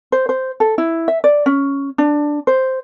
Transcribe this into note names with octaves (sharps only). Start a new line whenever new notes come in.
C5
C5
A4
E4
E5
D5
C#4
D4
C5